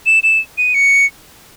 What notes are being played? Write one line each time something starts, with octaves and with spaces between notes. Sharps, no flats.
E7
E7
D#7
C#7